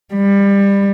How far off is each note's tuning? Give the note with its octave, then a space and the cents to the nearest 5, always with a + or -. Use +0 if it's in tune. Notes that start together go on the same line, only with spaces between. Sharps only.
G3 +25